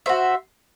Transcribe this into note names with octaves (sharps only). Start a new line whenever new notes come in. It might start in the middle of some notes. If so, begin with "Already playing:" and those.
F#4 C5 E5